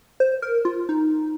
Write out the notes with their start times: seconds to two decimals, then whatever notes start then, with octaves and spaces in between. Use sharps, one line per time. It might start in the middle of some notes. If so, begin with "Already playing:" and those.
0.20 C5
0.42 A#4
0.65 F4
0.89 D#4